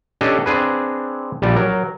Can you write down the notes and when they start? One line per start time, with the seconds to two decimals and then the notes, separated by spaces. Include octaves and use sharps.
0.21 C#4 D4 G4 A4 D#5
0.46 C4 D4 G#4 B4
1.42 A#1 G3 D5
1.56 F#3 A#4